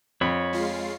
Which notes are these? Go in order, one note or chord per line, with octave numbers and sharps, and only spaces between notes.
F2 C#5 B5
G#3 F4 C7